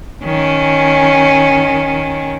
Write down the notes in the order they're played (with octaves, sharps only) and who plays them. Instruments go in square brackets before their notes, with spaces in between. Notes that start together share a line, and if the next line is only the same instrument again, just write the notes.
[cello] D#3 C#4